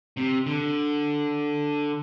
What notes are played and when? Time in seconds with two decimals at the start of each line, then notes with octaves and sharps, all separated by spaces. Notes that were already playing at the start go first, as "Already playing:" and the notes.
0.17 C3
0.46 D3